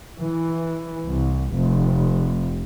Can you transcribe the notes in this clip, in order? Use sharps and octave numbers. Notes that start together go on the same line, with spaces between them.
E3
C2
F1